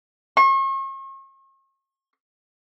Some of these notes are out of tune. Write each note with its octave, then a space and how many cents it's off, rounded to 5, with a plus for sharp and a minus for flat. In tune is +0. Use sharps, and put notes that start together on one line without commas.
C#6 -40